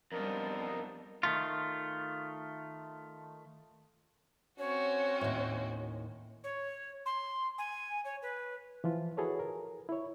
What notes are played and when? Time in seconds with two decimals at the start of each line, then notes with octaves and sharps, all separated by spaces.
0.12 F2 G3 B3 D4 D#4 A#4
1.23 D#3 A3 F4
4.59 C4 C#4 F#4 C#5
5.21 D#2 A2
6.44 C#5
7.06 C6
7.58 G#5
8.05 C#5
8.22 B4
8.84 E3 F3 F4
9.17 E4 F#4 G#4 A4 B4 C#5
9.39 A#4
9.89 E4 C#5